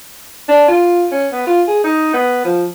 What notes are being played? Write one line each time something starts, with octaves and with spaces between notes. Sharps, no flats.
D4
F4
C#4
B3
F4
G#4
D#4
B3
F3